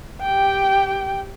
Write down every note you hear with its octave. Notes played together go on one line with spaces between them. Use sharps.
G4 G5